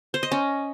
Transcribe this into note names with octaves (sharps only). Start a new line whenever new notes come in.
C5
D#5
C#4